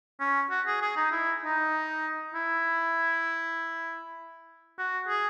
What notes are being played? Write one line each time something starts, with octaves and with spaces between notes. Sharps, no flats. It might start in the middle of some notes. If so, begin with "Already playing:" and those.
C#4
F#4
G#4
G#4
D#4
E4
D#4
E4
F#4
G#4